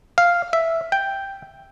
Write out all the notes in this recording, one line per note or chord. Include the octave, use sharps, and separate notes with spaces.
F5
E5
G5